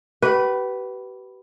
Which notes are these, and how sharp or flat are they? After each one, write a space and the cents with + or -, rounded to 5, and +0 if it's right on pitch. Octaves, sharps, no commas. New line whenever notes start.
G4 -40 B4 +0